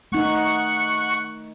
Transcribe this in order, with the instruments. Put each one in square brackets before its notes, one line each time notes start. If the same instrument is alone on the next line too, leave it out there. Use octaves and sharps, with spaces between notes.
[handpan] A3 D#4 [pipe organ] F#5 C#6